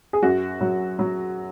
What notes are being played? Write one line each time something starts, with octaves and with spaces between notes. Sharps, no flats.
G#4
F#2 F#4
F#3
F#3